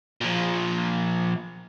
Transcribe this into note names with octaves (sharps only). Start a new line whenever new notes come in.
A#2 F3